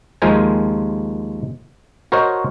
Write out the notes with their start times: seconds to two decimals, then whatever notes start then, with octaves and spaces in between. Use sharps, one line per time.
0.22 D#2 F3 G#3 A#4 C5 G#5
2.12 F#4 A#4 C5 C#5 D#5